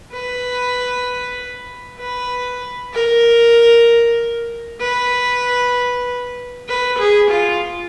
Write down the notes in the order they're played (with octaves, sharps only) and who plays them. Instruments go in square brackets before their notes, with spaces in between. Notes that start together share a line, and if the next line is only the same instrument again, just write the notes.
[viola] B4
B4
A#4
B4
B4
G#4
F4